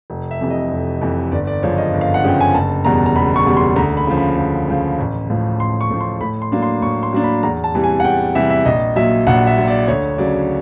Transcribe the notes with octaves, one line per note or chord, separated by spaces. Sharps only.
F1
E5
F2 C3 E3
D#5
F1
F2 C3 E3
G1 D5
D5
F#2 C#3 F3 C#5
D#5
G1
F5
F#5
F#2 C#3 F3 G5
G#5
F#1 A5
E2 B2 G3 A#5
A#5
F#1 B5
C#6
E2 B2 G3
C6
D2 A#5
B5
C#3 F3
B5
D2
C#3 F3
A1
A2 F3
A1 C6
C#6
A2 F3
C6
A2 B5
C6
F#3 A#3 D4
C6
A2 C#6
C6
F#3 A#3 D4
B5
E2 A#5
A5
C3 E3 G3
G#5
F#5
E2 G5
C3 E3 G3 E5
E5
A#1 D#5
A#2 F#3 E5
A#1 F#5
E5
A#2 F#3
D5
D2 C#5
C#3 F#3 D5